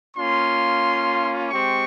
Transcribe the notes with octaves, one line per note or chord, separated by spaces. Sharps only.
A#3 C#4 F4 C6
G#3 C4 G4 C#6